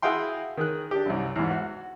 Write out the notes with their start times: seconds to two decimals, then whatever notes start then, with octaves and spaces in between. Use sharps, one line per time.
0.02 E4 F#4 G#4 F5 G5 C6
0.57 D#3 G#4 F#6
0.91 D4 G4
1.06 C2 F#2
1.36 E2 G#2
1.50 F#4